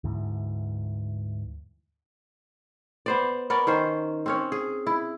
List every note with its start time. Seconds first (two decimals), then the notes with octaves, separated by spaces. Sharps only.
0.04 D2 G#2 E3
3.06 B3 C5 D5
3.50 B3 A#4 C#5 D5
3.67 D#3 C#4 C5
4.26 C4 C#4 C#5
4.52 G#4
4.87 E4